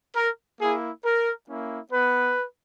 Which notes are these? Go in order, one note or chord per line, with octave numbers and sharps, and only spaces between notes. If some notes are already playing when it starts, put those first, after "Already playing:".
A#4
A#3 E4 G#4
A#4
A#3 C#4 E4
B3 B4